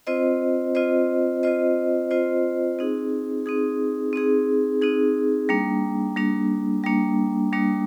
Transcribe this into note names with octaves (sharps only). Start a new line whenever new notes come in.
C4 F4 C5 D#5
C4 F4 C5 D#5
C4 F4 C5 D#5
C4 F4 C5 D#5
C4 D#4 G#4
C4 D#4 G#4
C4 D#4 G#4
C4 D#4 G#4
G3 A#3 D4
G3 A#3 D4
G3 A#3 D4
G3 A#3 D4